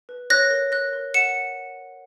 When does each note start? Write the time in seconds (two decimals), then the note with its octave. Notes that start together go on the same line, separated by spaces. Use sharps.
0.09 B4
0.30 C#5 F#6 A#6
0.51 A#4
0.72 A#4 F#6 A#6
0.93 A#4
1.14 F#5 C#7 E7